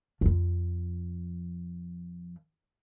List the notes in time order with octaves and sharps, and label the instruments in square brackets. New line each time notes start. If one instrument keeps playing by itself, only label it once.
[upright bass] F2 F3